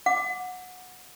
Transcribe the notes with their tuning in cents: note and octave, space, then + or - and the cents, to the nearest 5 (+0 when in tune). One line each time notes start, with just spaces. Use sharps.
F#5 -20 D6 +0